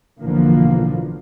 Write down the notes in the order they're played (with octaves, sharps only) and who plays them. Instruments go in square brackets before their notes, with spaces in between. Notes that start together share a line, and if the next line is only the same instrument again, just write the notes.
[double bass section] B1 A2 D3 E3 F3 A#3